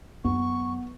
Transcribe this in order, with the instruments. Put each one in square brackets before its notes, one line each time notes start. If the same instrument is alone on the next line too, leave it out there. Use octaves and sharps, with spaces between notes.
[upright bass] F#2 [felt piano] B3 [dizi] C#6